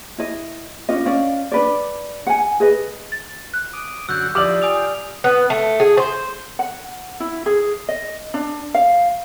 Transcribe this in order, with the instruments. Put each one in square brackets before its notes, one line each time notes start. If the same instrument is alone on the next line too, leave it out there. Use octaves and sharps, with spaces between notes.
[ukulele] E4 D#5
C#4 D4 F4 D#5
C#4 D5 F5
D4 B4 D5
F#5 G#5
G#4 B4 D#5
[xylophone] A6
F#6
[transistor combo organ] D6 D#6
[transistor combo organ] F#2 D3 F#4 [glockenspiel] E6 G6
[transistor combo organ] F3 D#4 E4 [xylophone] G4 F6 F#7 [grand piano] D5 D6
[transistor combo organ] F4 G5 [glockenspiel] G#5 D#6 F7
[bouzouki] B3
A3
G#4
C5
[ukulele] F#5
E4
G#4
D#5
D4
F5